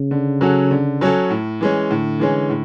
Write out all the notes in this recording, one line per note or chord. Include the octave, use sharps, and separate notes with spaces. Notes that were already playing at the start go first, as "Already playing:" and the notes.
Already playing: C#3
D3
F#3 C#4 F#4 A4
D3
F#3 C#4 F#4 A4
A2
E3 G#3 C#4
A2 D3
E3 G#3 C#4
A2